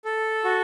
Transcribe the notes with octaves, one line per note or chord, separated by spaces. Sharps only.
A4
F#4